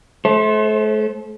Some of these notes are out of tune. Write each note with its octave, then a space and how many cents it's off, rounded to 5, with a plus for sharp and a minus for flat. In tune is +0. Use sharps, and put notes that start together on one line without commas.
A3 -35 C5 +20